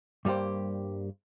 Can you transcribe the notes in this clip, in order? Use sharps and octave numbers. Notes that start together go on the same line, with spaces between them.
G2 G3 A#3 G4 C5